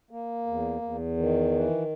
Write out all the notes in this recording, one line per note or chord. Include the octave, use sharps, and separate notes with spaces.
A#3
E2
E2
D#3
E3